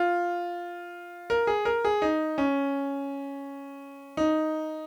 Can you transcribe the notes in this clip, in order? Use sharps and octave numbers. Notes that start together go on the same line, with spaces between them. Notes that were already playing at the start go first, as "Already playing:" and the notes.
Already playing: F4
A#4
G#4
A#4
G#4
D#4
C#4
D#4